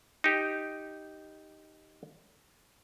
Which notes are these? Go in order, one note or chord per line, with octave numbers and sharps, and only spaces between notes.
D#4 G4